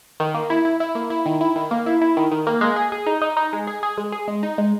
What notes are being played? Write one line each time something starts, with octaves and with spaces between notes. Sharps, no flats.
D#3
A#3
E4
E4
E4
A#3
E4
D#3
E4
D#3
A#3
E4
E4
D#3
D#3
A#3
G#3
G#4
G#4
D#4
D#4
D#4
G#3
G#4
G#4
G#3
G#4
G#3
D#4
G#3